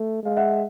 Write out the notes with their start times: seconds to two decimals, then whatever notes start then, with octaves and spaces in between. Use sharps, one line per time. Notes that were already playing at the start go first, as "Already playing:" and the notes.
Already playing: A3
0.23 G#3 F5
0.37 E5 F#5